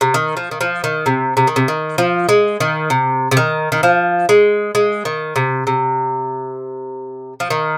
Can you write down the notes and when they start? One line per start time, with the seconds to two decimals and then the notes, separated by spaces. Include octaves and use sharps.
0.01 C3
0.14 D#3
0.37 F3
0.51 D#3
0.61 F3
0.84 D#3
1.06 C3
1.37 C3
1.47 D#3
1.56 C3
1.68 D#3
1.98 F3
2.29 G#3
2.60 D#3
2.90 C3
3.31 C3
3.37 D#3
3.72 D#3
3.83 F3
4.29 G#3
4.75 G#3
5.05 D#3
5.36 C3
5.67 C3
7.40 F3
7.50 D#3